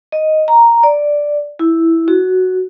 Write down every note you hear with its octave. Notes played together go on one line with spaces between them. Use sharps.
D#5
A#5
D5
E4
F#4